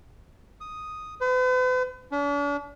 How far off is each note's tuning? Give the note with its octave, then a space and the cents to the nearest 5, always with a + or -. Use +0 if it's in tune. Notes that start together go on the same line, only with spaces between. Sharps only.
D#6 +0
B4 +45
D4 -45